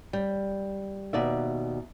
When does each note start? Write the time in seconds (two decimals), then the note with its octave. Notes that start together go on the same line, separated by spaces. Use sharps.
0.13 G3
1.13 D#2 B2 D5 E5